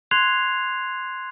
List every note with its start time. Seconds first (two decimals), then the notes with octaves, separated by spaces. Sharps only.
0.11 C6 F#6 G#6 C7 F7